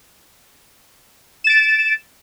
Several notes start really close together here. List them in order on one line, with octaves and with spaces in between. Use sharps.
E7 A6 D7